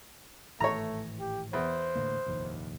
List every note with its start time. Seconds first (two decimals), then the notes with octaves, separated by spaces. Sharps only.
0.60 G#1 A2 E3 A3 C#5 A#5
1.20 G4
1.53 E2 C5
1.95 A2 D3 A#3
2.26 F1 A#1 D#2